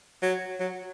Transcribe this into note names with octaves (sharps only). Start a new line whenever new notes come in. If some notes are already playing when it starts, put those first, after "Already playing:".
F#3
F#3